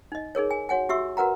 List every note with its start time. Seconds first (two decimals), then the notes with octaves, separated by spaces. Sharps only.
0.12 D#4 D#5
0.35 D#4 G#4 A#4 C#5
0.51 G#5
0.69 F#4 C#5 F#5 G#5
0.89 F#4 G4 E5 C#6 E6
1.17 F#4 A#4 B4 F#5 A#5